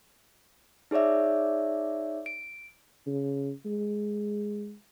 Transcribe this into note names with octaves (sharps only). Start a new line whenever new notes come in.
D#4 G#4 C#5 D5 E5
D7
C#3
G#3